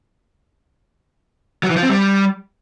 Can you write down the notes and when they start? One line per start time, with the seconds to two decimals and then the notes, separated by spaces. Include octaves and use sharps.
1.63 F#3
1.70 E3
1.76 F3
1.83 C4
1.89 G3